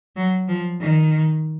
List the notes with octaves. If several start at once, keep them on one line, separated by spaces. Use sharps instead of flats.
F#3
F3
D#3